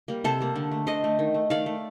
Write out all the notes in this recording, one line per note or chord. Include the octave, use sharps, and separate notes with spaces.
G3 A#3
C3 A4 C5
G3 A#3
D3
A3
D3 C5 D#5
A3
D#3
A3
D#3 D5 F5
A3